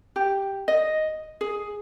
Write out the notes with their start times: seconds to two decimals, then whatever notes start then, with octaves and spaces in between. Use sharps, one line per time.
0.16 G4
0.68 D#5
1.41 G#4